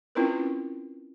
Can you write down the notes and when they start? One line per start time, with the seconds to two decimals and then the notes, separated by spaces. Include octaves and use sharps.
0.15 C4 C#4 E4 F4 A#4 B4